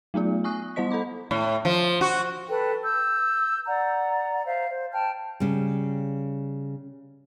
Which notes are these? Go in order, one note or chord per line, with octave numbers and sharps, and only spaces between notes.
F#3 A3 B3 F4
G#5 C#6 D#6 F#6
G3 B3 C5 D#5 B6
A4 A#5 B5 D6
A2
F3
F#4
A4 B4 G5 F#6
E6 G6
D5 F#5 A#5
C5 E5 F5
C5
G5 A5 F6
C#3 G3